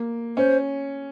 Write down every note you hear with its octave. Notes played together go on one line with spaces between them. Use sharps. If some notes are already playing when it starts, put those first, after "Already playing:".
Already playing: A#3
C#4 C5